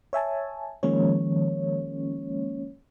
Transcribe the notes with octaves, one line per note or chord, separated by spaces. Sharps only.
C#5 E5 G#5 A5
D#3 F3 G#3 A#3 C#4 C#5